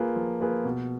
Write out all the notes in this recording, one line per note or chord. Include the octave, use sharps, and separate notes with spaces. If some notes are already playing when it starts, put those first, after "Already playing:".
Already playing: A#3 F4 G#4 B4
F3
A#3 F4 G#4 B4
B2